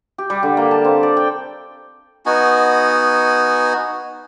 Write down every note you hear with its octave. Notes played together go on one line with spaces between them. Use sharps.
G4
G3
D3
A#3
A5
C4
D5
G5
B3 D#4 F#4 G#5